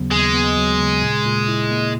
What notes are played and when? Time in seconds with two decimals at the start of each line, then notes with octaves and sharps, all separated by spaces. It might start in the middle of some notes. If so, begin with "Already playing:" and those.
Already playing: D#2 C#3 F#3 B3
0.11 D#2 G#3
0.34 B3
0.57 F#3
0.80 C#3
1.02 A#2
1.25 A#2
1.48 E4
1.71 A#3